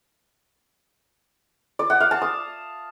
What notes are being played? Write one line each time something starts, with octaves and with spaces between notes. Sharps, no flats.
D5
F#5
F5
A5
D#6